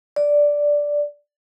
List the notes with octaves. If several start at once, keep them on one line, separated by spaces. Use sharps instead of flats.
D5